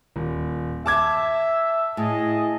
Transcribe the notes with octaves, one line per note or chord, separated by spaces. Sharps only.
D#1
E5 A5 D6 G#6
A2 G#4 D#5 A5